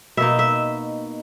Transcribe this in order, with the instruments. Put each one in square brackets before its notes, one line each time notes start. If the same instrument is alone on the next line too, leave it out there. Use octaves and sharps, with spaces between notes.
[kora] B2 A#3 D#4 E5
E5